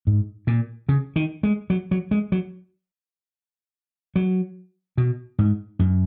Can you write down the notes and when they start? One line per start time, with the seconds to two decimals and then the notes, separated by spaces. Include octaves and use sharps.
0.07 G#2
0.47 A#2
0.89 C#3
1.16 D#3
1.43 G#3
1.70 F#3
1.91 F#3
2.11 G#3
2.32 F#3
4.16 F#3
4.97 B2
5.39 G#2
5.79 F#2